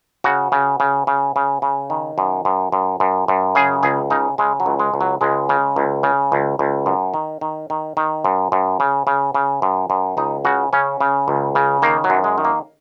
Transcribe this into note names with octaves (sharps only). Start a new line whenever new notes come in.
C#3 F#4
C#3
C#3
C#3
C#3
C#3
D#3
F#2
F#2
F#2
F#2
F#2
C#3 G#4
C#2 G#4
C#3 D#4
C#3 G#3
F#3
C#2
G#3
C#2
F#3
C#2 G#3
C#3
C#2
C#3
C#2
C#2
F#2
D#3
D#3
D#3
D#3
F#2
F#2
C#3
C#3
C#3
F#2
F#2
C#2 D#4
C#3 F#4
C#3 C#4
C#3
C#2
C#3
D#3 A#3
F#3
F#2
G#3
D#3
A#3